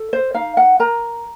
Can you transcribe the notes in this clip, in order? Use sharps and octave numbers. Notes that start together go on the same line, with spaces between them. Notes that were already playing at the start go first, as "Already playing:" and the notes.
Already playing: A4
C5
D#4 F5
F#5
A#4 A#5